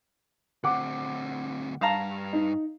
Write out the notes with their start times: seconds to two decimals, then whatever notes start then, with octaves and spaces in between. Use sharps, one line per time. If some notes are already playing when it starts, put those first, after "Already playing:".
0.64 D2 C4 F#5 D6
1.81 G2 F5 A5 A#5
2.33 D#4